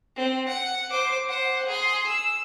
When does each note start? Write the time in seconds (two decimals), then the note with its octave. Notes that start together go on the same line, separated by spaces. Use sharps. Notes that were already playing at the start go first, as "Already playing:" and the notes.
0.15 C4
0.48 F#5
0.90 C5 D6
1.29 C5 F#5
1.67 G#4 C6
2.07 E6